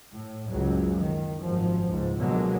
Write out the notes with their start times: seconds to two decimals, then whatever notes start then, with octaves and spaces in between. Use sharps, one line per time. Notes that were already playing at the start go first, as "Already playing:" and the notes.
0.11 A2
0.48 F#1 C#2 F#3
0.97 D#3
1.40 G#1 F#2 F3
1.88 C#2 G#2
2.18 B2 D3 F#3 G#3 A#3